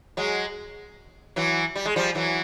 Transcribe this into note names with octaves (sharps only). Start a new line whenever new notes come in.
F#3 G#3
E3 F#3
G3
G#3
F3 G3
E3 F#3